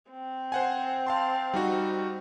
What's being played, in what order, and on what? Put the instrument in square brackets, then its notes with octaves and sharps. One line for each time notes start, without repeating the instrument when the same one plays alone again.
[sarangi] C4
[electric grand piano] C5 F#5 G#5
F5 A5 C6
G3 D#4 F#4